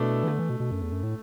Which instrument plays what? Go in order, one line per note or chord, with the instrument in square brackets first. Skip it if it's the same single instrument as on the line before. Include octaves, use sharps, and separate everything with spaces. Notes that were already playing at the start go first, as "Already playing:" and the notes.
Already playing: [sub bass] B2 [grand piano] A3 B3 D4 E4
[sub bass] E3
[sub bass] D3 [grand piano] A3
[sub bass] E3
B2
B2
F#2
E2
F#2
A2